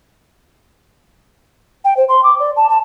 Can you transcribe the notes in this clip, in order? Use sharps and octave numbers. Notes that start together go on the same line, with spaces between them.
G5
C5
C6
D6
D5
A5
A5